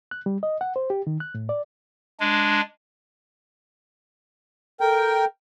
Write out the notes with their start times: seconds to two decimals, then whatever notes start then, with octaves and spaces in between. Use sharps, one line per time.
0.11 F#6
0.26 G3
0.43 D#5
0.61 F#5
0.76 C5
0.90 G4
1.07 D#3
1.20 F#6
1.34 A2
1.49 D5
2.20 G#3 D4
4.81 A4 A#4 G5